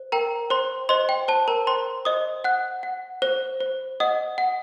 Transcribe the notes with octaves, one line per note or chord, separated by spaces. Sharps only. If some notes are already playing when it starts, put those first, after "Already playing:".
Already playing: C5
A#4 G5 A#5
C5 C6
C5 D#5 C6
G5
C5 A5
A#4 A#5
C5 G5 C6
C5 D#5 D#6
F#5 F#6
F#5
C5
C5
D#5 F#5 D#6
F#5